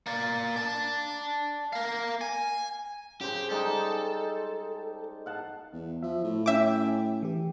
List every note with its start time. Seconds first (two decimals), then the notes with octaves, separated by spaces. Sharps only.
0.07 A#3 D5
0.56 D5 A5
1.73 A#4 F5
2.21 G#5
3.21 C#3 G4 C5
3.50 G3 G#3 D#4 A4
5.26 F5 F#5 A5
5.73 E2
6.03 F3 E5
6.24 A2
6.46 C#4 E5 G5 G#5 D6
7.23 E3 G4